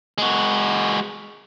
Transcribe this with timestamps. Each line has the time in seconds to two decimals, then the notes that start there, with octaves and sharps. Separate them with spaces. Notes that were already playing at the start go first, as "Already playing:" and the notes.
0.18 G#3 F#4